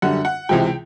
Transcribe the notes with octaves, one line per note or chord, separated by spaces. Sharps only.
F#2 D3 G3 F#5
F#5
C#2 C3 E3 G#3 G5